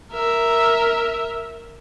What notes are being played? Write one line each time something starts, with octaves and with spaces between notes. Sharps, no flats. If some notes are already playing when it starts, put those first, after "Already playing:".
A#4 E5